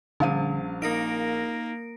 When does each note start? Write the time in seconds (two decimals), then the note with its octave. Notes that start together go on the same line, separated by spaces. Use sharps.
0.20 A#1 D3 G3 C#4 F5 D#7
0.82 A#3 D#4 A#4 A#6 D7